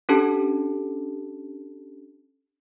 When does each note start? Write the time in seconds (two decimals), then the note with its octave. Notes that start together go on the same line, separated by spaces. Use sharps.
0.09 C#4 D4 G4 A4 A5